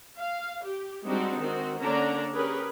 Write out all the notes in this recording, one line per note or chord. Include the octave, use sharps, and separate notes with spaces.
F5
G4
G3 G#3 C4 D4 D#4 F#4
D#3 C4 F#4
D3 A#3 C#4 D4 A#5
C#4 G4 G#4 A#4 B4